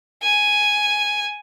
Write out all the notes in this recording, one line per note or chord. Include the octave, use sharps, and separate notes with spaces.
G#5